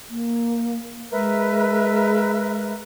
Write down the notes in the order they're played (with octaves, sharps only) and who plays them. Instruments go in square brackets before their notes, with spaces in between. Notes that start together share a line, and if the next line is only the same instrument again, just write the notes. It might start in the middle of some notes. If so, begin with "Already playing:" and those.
[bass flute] A#3
[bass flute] G#3 [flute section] A#4 B4 E5